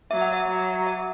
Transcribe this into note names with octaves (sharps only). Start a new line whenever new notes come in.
F#3 E5
F#5
E5
F#3
E5